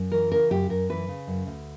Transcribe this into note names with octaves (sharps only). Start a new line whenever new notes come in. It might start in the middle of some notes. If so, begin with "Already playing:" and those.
Already playing: F#2
E3 A#4
C#3 A#4
F#2 G4
F#2 A#4
E3 B4
C#3
F#2
D2